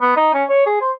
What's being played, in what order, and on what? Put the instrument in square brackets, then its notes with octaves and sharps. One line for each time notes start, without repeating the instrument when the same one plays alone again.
[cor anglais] B3
D#4
C#4
C#5
G#4
C5